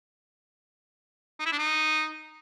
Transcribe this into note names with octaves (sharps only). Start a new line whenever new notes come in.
D#4
E4
D4
D#4